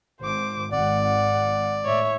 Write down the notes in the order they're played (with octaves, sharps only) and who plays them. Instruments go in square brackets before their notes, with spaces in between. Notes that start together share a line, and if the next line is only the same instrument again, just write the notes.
[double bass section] G#1 [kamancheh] C5 D6
[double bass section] G#1 [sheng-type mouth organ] D5 [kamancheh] F#5
[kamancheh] F#5
[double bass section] A2 [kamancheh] C#5 E5